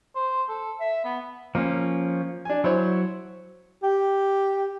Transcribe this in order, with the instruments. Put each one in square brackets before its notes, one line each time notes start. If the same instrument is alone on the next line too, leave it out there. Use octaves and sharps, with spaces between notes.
[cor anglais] C5
A4
E5
B3
[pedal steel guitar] F3 C#4 [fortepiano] A#3
[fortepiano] D4 G#5
[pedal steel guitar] F#3 [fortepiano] E4 C5 C#5
[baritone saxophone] G4